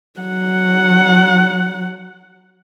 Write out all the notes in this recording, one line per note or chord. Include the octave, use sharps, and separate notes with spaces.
F#3 F#5